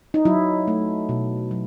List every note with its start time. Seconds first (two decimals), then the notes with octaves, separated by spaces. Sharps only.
0.14 D#4
0.25 F#3 E4
0.68 A3
1.09 B2
1.51 F#3